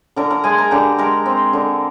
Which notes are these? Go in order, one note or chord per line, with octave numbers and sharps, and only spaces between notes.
D3 A#4 A#5
A#4 A#5
G#3 G#4 G#5
A#4 A#5
D3 G4 G5
G#3 A#4 A#5
C4
D3